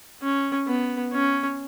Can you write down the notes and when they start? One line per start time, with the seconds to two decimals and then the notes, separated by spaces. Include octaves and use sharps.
0.22 C#4
0.68 B3
1.13 C#4